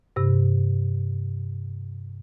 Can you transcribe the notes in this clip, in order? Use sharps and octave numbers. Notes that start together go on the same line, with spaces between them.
G2 C3